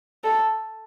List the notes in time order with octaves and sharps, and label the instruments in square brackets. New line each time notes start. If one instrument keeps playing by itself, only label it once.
[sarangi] A4